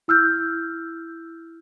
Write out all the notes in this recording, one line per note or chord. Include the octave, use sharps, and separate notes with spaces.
E4 E6 F6 G6